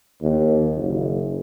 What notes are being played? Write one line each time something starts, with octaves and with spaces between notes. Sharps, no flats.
D#2
F#1